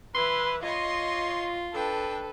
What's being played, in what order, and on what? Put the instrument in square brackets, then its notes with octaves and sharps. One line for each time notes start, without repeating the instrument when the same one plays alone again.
[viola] E3 E4 [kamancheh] B4 [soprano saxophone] C6
[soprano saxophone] F4 [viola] C#5 C6 [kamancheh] D#5
[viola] D4 G5 [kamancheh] A4 B4